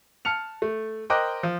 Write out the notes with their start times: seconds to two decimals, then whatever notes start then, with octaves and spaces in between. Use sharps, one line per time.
0.25 A5 F6 C#7 F7
0.62 A3
1.10 A#4 C5 D#5 G5 D6 F#6
1.43 F3